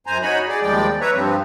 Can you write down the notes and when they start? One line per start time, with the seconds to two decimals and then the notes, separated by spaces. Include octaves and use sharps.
0.07 F#2 C5 G#5 A#5
0.22 D#4 F#4 C#5 G#5 B5
0.48 G#4 D5
0.62 D#2 F3 G3 G#3 D5 G5
1.01 B4 C#5 E5 A#5
1.14 G2 F3 G3 C4